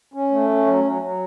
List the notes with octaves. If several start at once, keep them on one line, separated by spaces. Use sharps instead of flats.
C#4
A3
C#4
F#3
F#3
F#3